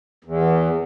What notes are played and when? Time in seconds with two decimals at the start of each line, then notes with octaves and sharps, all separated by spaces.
0.24 E2